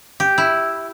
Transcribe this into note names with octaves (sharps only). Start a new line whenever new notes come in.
G4
E4